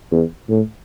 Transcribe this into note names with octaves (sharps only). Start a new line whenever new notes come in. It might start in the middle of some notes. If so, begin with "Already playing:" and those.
E2
A2